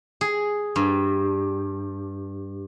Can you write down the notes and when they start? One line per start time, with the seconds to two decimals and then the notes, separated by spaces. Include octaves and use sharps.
0.21 G#4
0.76 G2